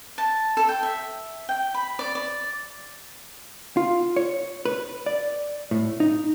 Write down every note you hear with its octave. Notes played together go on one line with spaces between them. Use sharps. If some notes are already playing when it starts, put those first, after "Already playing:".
A5
A4
G5
E5
G5
B5
D5
D5
F4
C#5
B4
D5
A2
D#4